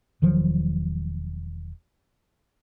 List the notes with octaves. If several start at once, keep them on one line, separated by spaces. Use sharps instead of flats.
E1 D#3 F3 F#3